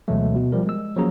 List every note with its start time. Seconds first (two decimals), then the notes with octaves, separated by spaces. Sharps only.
0.08 D2 B2 E3 F#3 G#3 A3
0.35 B2
0.52 F3 G3 A#4
0.66 G#3 E6
0.96 F3 F#3 A#3 C#4 G#4 A#5